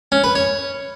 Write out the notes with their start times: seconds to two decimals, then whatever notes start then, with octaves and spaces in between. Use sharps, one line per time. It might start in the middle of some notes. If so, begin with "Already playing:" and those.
0.12 C#4
0.24 B4
0.35 C#5